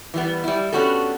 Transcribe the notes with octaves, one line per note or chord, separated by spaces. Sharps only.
E3 G3 B3
G3 E4
B3 C#4 D4 F#4 G4 A4